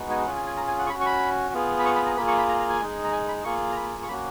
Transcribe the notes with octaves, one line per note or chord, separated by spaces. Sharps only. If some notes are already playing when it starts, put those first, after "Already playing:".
Already playing: G#3 B3 D#4 F#4
G#5
C#4 F4 G#4 F#5
G#5
G#5
A#5
G#5
F#5
C#6
C#4 F#4 B5
C#6
B5
B3 F4 G#4
B5
C#6
B5
A#5
A#3 F4 G#4 B5
C#6
B5
A#5
A#5
G#5
G#3 D#4 G#4
A#5
G#5
B5
A#3 F4 G#4 C#6
A#5
B5
C#6
A#3 C#4 F#4 B5